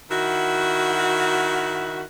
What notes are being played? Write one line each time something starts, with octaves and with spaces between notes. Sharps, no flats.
D#3 E4 F#4